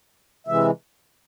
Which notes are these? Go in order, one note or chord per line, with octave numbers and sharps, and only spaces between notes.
C3 E3 G#3 E5